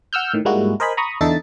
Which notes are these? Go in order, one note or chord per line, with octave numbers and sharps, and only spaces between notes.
F#5 E6 F6 G6
A2 D#3
G#2 G3 G#3 A#3 E4 F#4
A#4 C5 D#5 G#5 B5
A#5 B5 C#6 D#6
E2 D3 D#4 A4 E5 A6